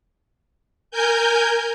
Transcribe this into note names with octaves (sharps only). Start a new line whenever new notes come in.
A#4 G#5 G6